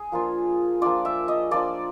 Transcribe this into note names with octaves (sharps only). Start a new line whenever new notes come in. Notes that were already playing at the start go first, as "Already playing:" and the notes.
Already playing: G#4
F3 A#3 D4 F4
F3 A#3 D4 F4 D5
E5
D#5
F3 A#3 D4 F4 D5